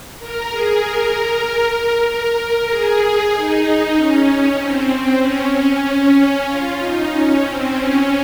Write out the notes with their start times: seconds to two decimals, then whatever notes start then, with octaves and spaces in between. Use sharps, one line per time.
0.19 A#4
0.50 G#4
0.82 A#4
1.75 A#4
2.07 A#4
2.69 G#4
3.32 D#4
3.95 C#4
4.58 C4
5.21 C#4
5.52 C#4
5.83 C#4
6.47 F4
6.78 D#4
7.09 C#4
7.41 C4
7.72 C#4